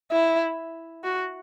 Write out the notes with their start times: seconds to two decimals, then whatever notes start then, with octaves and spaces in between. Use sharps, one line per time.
0.11 E4
1.04 F#4